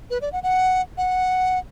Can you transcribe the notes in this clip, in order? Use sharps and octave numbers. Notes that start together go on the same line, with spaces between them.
B4
D5
F#5
F#5
F#5